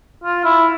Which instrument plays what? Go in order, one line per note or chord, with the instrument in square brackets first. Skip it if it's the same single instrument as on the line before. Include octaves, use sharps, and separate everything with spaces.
[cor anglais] F4
E4